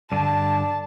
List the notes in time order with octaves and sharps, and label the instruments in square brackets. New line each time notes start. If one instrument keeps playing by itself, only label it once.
[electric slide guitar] G2 D3 [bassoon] D4 [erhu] A5